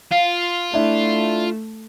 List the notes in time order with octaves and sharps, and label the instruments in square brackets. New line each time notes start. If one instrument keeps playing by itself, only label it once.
[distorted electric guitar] F4 [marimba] F5
[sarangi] A3 [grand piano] D4 E4